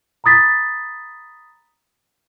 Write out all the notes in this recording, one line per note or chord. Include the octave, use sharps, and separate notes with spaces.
A#5 B5 D#6 A6 B6